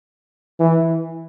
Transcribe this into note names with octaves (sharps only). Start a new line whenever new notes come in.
E3